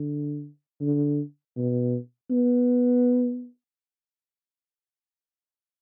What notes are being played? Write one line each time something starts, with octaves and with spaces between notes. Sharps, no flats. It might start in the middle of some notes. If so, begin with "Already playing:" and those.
Already playing: D3
D3
B2
B3